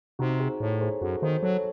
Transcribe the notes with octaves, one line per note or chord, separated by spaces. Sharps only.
C3 D#4 F#4
G#4 C5
A2 A4 C#5
G#4 C5
F#2 F#4 A4
D#3 G#4 C5
F#3 A4 C#5